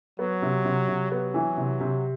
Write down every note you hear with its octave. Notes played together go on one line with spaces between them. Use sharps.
F#3 B3
C3
C3
C3
F#3 B3
E3
C3
C3